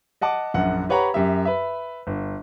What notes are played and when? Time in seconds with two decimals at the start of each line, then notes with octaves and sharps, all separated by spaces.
0.21 D#5 F#5 A5 D6
0.54 A#1 F#2 F#5
0.89 G4 B4 C#5 F#5 A#5
1.14 F#2 G4 E5
1.45 B4 E5
2.07 G1